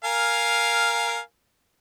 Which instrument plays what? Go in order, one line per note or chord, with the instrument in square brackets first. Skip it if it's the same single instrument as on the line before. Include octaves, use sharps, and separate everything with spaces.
[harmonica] A#4 F5 G#5